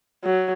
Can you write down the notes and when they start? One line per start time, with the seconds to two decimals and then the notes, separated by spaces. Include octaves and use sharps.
0.24 F#3